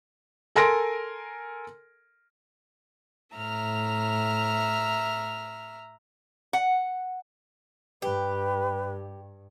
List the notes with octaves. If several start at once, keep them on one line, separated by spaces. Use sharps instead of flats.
A4 A#4 G#5 C6 A#6 D7
A2 E5 A#5 F6
F#5
G2 G4 B4